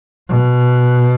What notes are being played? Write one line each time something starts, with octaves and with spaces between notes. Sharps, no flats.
B2